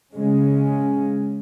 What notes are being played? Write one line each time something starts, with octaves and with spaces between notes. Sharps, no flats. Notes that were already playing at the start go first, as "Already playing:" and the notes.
C#3 G#3 C#4